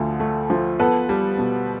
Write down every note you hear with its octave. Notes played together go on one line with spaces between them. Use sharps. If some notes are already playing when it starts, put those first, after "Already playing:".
Already playing: D2 D3 F3
A3
F3
B3 A4 B4
G3
B2